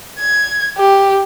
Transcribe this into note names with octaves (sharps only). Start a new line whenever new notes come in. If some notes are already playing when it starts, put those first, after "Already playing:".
G#6
G4